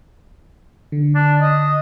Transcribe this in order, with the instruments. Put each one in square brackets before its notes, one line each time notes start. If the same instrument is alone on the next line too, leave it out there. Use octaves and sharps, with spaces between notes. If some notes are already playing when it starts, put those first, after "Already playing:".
[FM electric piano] D3
[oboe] D4
D#5